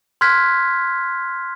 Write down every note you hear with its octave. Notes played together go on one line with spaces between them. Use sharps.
C6 F6 F#6 G#6 B6